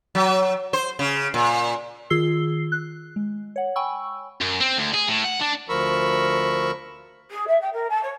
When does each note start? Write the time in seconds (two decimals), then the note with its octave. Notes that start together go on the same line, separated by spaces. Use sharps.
0.15 F#3
0.73 C5
0.99 C#3
1.34 A#2
2.10 D#3 F4 G#4 E6 C7 G7
2.72 F#6
3.16 G#3
3.56 C#5 F#5
3.76 G5 G#5 B5 C#6 E6
4.41 F#2
4.61 C4
4.77 D2
4.94 G#4
5.08 A2
5.25 F#5
5.41 D4
5.69 D2 F3 A#4 B5 C#6 E6
7.31 G#4
7.47 E5
7.61 G5
7.72 A#4
7.89 A5
8.03 C#5